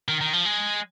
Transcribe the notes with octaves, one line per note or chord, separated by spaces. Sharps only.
D#3
D#3
F3
G#3